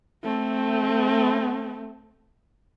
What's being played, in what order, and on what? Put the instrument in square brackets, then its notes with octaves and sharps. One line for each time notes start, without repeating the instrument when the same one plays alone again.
[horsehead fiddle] A3 C4